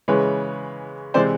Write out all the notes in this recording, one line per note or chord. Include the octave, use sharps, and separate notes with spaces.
C#3 E3 G#3 B4 C#5
C3 E3 G#3 C5 D5